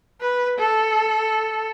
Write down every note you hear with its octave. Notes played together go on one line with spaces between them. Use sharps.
B4
A4